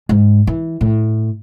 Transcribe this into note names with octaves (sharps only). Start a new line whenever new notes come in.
G#2
E3
A2